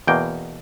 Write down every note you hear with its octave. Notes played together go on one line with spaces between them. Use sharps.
E2 B2 A#3 G5